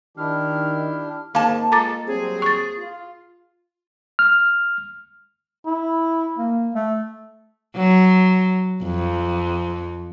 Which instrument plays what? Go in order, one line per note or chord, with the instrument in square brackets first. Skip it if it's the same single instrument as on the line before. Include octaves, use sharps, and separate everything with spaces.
[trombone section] D#3 [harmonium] D4 G4 [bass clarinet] E4 [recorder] F6
[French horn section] G#2 C4 [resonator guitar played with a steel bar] A#3 A5
[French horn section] G#3 F4 A4 [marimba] A#5 D6 A6
[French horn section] F#3 G3 C4 [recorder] G#4
[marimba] C#6 A6
[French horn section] F4
[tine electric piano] F6
[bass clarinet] E4
A#3
A3
[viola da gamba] F#3
F2